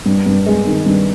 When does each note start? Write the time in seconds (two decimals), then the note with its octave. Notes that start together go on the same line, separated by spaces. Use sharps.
0.06 G2
0.26 G2
0.46 G#3
0.66 D#3
0.86 G2